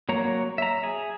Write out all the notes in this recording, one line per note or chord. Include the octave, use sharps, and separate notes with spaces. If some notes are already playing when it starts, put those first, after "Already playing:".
F#3 A#3 C#5 A#5
E5 A#5
G#4